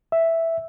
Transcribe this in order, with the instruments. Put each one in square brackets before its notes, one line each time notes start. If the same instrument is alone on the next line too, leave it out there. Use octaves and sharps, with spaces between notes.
[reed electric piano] E5